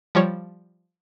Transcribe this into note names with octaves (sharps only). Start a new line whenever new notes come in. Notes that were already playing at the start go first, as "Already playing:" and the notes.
F3 G3 C#5